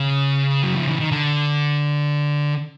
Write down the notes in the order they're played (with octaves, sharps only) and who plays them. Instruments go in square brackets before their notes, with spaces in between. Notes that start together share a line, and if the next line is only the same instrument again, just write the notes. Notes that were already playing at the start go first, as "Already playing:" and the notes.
Already playing: [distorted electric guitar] C#3
F#3
F3
E3
D#3
D3